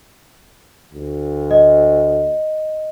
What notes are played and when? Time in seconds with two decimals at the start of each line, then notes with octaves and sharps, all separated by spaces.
0.94 D2
1.51 D#5